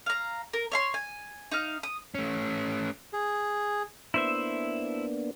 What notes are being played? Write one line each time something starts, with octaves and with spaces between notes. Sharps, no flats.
F5 A#5
A#4
C#5 E5 C6
G#5
D#4 F5
D#6
A3 C#4
G#4
A#3 B3 D4 E4 C5 E5